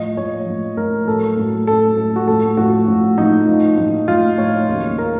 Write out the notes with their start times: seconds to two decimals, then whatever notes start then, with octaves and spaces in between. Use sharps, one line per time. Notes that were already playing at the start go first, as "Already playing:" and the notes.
Already playing: A2 F3 D#5
0.17 A2 F3 C#5
0.47 A2 F3
0.77 A2 F3 A#4
1.07 A2 F#3 A4
1.37 A2 F#3
1.67 A2 F#3 A4
1.98 A2 F#3
2.16 F#4
2.28 A2 F3 A4
2.57 A2 F3 F#4
2.88 A2 F3
3.18 A2 F3 D#4
3.48 A2 F3
3.78 A2 F3
4.08 A2 F3 F4
4.38 A2 F3 C#5
4.68 D#2 C#3 F#3
4.98 C#3 F#3 A#4